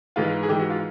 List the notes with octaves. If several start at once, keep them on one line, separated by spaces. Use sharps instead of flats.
G#2 E3 G#3 F4
G#4
G#2 E3 G#3 G4
F#4
F4